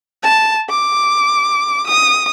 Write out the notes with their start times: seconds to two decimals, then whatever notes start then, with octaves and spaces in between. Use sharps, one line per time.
0.23 A5
0.70 D6
1.88 D#6